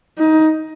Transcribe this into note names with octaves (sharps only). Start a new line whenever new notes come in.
D#4